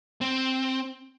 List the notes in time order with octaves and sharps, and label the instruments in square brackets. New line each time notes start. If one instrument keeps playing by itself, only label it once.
[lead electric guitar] C4